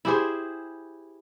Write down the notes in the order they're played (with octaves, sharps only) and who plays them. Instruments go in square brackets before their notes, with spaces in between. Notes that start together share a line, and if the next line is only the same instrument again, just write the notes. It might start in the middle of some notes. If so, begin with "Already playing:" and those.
[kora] E4 G4 G#4 C5